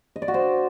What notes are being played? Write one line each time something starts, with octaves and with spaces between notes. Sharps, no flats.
D#5
D5
F#4
C5